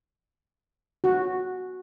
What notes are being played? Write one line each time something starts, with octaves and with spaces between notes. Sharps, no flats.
F#4